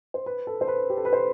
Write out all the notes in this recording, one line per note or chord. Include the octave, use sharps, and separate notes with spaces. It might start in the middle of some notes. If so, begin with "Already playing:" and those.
C5
B4
A4
C5
B4
G4
A4
B4
C5